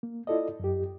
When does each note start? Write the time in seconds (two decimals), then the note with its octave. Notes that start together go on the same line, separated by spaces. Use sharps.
0.03 A#3
0.27 E4 F4 A4 D5 D#5
0.60 F#2 G4